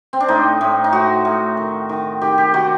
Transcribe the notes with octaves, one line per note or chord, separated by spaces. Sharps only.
C4
D4
A2 D#4
A2
D#4
A2 F#4
A2
D#3
D#3
D#3 G4
G4
D#3 F#4